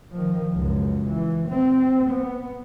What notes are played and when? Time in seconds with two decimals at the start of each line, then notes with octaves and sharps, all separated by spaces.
0.12 D#3 F3
0.55 C#2 F#2
1.09 E3
1.49 C4
2.10 B3